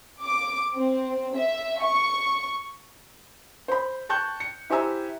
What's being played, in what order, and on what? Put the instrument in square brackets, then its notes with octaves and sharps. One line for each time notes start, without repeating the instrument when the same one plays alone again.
[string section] D6
C4
E5
C#6
[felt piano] C5 B5
G5 A5 C#6 F#6 G6
C#7
E4 G4 C5 G#5 A#5 E6